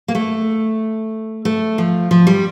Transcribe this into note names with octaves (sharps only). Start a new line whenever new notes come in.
A#3
A3
A3
F3
F3
G3